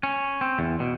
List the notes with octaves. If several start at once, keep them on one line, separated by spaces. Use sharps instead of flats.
C#4
C4
E2
B2